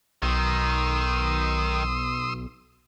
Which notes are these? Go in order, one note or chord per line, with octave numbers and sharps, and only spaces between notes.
B1 D#3 C6 D#6 E6